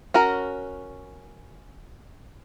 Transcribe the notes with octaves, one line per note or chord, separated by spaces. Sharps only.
C#4 F#4 A#4